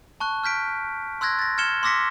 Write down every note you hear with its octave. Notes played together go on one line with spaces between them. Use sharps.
A5 C#6 F#6
F6 G6 B6 D7
C6 E6 F#6 G#6 A#6
A6 A#6
F6 G#6 C#7 E7 G7
C6 D6 E6 A#6 B6 C#7